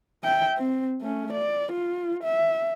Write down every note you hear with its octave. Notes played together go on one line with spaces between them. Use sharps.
E5 G5
C4
A3 C#4
D5
F4
E5